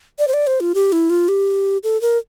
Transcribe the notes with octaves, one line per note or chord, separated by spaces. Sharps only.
D5
C5
D5
C5
F4
G4
E4
F4
G4
A4
A#4